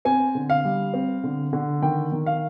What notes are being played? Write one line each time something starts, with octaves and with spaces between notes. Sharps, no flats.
C4 G#5
D3
F5
G3
C4
D3
D3
D#3 G5
D#3
F5